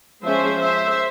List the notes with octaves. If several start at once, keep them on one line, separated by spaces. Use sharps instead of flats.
F3 G#3 C#4 C5 E5
C5 E5